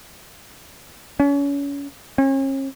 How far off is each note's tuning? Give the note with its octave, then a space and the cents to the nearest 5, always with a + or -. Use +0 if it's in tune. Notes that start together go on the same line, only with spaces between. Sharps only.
C#4 +30
C#4 -40